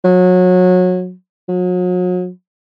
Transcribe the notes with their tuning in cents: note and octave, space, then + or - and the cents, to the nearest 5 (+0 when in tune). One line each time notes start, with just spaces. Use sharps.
F#3 -25
F#3 -40